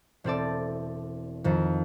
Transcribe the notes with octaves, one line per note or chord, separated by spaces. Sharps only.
E1 C4 A4 D5
F2 D#3